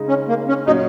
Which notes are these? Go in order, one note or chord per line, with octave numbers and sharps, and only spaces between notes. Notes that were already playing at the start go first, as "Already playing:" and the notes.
Already playing: C#3 G#3 D#4
C#4
A#3
C#4
A#2 F#3 C#4 D#4